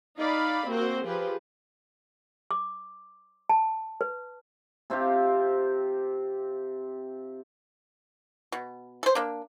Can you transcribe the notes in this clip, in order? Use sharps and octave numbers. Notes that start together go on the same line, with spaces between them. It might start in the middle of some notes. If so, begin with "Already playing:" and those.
D#4 D5 F5 B5
A#3 C4 F#4 C5
F3 G4 G#4 B4
D6
A5
B4
C3 C4 F4 G4
B2
A4 C5
A#3 D4